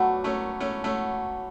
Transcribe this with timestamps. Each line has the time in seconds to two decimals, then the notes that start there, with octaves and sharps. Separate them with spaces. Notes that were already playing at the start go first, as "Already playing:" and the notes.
Already playing: F#3 A3 B3 D4 F#4
0.24 A3 C#4
0.60 A3 C#4
0.84 A3 C#4